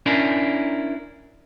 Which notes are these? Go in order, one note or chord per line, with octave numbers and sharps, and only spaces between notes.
C#4 D4 E4 A#4